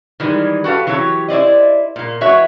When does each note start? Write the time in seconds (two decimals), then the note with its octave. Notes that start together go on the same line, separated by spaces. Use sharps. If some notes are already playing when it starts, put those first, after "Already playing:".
0.20 D#3 E3 G3 G#3
0.64 F#4 G4 A4 B4 F5
0.87 E3 F#3 G4 A4 C#5
1.28 E4 C5 D5 D#5
1.96 A#2 A#3
2.21 E3 F#4 C#5 E5